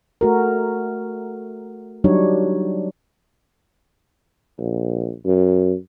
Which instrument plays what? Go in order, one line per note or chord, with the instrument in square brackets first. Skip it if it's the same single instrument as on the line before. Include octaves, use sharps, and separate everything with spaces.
[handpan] A3 F#4 A#4
F#3 G3 D4 D#4 C#5
[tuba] A#1
F#2